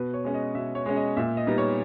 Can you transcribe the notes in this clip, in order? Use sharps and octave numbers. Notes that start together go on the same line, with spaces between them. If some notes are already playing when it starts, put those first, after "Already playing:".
Already playing: B2 B4
C#5
G#3 C#4
D#5
B2 E5
C#5
G#3 C#4
D#5
A#2 E5
D#5
G3 B3 D#4
C#5